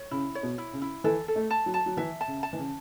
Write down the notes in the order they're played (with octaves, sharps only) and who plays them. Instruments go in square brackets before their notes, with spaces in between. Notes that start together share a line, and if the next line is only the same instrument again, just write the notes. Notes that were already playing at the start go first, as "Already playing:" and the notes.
Already playing: [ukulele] C#5
[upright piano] C#3 [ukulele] E4
[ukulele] C#5
[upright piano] B2
[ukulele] E4
[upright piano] C#3
[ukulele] E4
[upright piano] E3 [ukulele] A4
[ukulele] A4
[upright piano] A3
[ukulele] A5
[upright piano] F#3
[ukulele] A5
[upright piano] F#3
[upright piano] E3 [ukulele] E5
[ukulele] A5
[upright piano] C#3
[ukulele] A5
[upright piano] E3
C#3